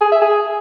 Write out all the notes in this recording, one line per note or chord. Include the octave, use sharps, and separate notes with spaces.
G#4
E5
G#4